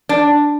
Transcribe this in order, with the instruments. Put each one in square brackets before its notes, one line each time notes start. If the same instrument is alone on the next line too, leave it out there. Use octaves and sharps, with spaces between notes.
[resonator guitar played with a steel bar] D4